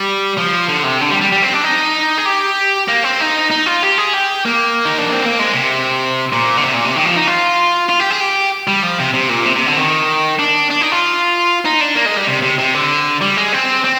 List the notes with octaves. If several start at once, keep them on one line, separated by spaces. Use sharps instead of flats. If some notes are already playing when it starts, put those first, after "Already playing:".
Already playing: G3
F3
D3
C3
D3
G3
G3
G3
C4
D4
D#4
G#4
G4
A#3
C4
D#4
D#4
F4
G4
G#4
G4
A#3
D#4
D4
C4
A#3
G#3
C3
A#2
D3
C3
A#2
C3
D#3
F3
D#4
F4
F4
G4
G#4
G4
G3
F3
C3
C3
A#2
C3
C3
D3
D#3
D4
D4
D#4
F4
D#4
D4
A#3
G#3
G3
C3
C3
C3
D3
G3
G#3
C4
C4